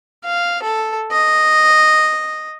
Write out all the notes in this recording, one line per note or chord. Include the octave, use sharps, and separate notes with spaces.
F5
A4
D#5